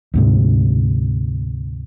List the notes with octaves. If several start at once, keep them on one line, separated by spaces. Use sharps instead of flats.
D2 G#2 C3